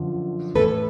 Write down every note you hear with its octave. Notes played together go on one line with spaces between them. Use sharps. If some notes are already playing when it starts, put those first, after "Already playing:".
Already playing: F#2 D3 F3
A2 E3 A4 B4